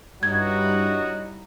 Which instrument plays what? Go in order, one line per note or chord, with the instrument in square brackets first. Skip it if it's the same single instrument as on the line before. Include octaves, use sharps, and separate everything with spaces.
[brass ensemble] G2 [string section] G3 D#4 E4 [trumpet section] F#4 C#5 D#5 [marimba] G#6